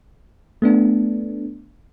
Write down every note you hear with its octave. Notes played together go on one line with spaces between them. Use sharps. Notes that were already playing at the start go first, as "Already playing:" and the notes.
A3 B3 D4